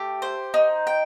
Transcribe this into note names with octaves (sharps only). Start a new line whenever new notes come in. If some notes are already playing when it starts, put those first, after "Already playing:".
Already playing: A3 G4
C5
D#4
G5